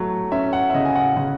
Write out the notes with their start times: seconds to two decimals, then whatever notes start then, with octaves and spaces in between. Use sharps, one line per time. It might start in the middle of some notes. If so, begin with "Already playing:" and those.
Already playing: F#3 A3
0.32 C#4 E5
0.53 F#5
0.70 E5
0.74 C#3 D#5
0.85 G#5
0.95 F#5
1.17 C#3 F#5